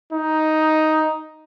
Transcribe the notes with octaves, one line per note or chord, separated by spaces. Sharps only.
D#4